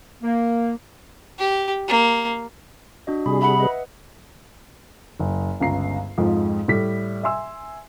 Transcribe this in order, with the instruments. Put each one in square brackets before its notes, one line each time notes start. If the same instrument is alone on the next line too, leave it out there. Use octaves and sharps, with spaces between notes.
[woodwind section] A#3
[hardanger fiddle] G4
A#3
[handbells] D4 F#4 D#5
[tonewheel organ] C3 G3 G#4 [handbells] B5
[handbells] E5 F#5 C#7 [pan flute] B5
[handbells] B4 D#5
[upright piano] F#1
G1 C#2 C#4 A#5 C7
F2 G#2 F3
A2 G3 B6
E5 G#5 C6 E6